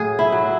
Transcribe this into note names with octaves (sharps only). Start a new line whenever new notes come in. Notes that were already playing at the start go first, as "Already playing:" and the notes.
Already playing: A2 F#3 G#4
E4
F#3